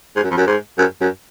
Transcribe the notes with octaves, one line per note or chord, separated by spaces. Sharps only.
G#2
F#2
F2
F#2
G#2
F#2
F#2